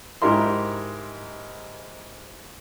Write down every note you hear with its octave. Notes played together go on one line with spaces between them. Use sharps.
G#2 E4 G4 A#4 E5 C6